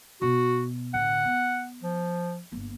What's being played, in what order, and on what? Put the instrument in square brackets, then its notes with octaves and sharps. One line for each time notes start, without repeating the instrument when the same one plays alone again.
[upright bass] B2 [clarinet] F#4
[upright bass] A2 D3 [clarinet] F#5
[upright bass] B3
[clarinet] F3
[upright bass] G1 A#3